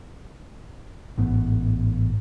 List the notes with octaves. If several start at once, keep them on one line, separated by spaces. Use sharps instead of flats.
A1 G#2 B3